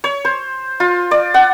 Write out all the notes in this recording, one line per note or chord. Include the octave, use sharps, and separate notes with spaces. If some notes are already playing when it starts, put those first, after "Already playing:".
C#5
C5
F4
D5
F#5